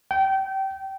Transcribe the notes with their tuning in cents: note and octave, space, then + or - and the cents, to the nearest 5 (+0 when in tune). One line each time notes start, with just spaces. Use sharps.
G5 -25